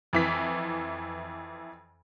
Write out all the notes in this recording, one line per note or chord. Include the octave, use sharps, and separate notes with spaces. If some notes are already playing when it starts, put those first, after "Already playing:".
F2 E3 B6